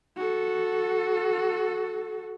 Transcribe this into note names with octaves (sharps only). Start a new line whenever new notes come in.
F#4 A4